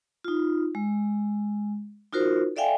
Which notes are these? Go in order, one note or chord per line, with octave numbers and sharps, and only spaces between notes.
D#4 F4
G#3
D#4 F4 F#4 A#4 C5
A4 D5 E5 F5 G5 G#5